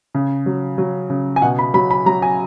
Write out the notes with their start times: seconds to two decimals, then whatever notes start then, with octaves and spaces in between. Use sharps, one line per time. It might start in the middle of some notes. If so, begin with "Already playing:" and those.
0.15 C#3
0.46 F#3
0.78 F#3
1.10 C#3
1.36 G#5
1.42 B2 F#5
1.59 B5
1.74 F#3 B5
1.91 B5
2.06 F#3 A#5
2.22 G#5